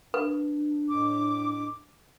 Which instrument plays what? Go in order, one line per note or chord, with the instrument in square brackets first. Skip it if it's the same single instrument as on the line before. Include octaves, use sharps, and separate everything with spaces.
[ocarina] D4 [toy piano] B4
[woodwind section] F2 A2 D6